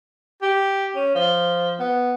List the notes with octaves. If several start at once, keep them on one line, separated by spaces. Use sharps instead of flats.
G4
C#4
F3
B3